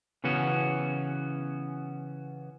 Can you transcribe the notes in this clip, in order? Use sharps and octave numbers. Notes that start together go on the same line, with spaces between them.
C#3 E3 B3 C#4 F#4